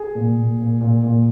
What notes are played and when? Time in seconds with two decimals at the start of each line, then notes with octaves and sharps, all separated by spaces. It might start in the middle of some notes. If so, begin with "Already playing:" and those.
Already playing: G#4
0.15 A#2
0.37 A#2
0.59 A#2
0.81 A#2
1.03 A#2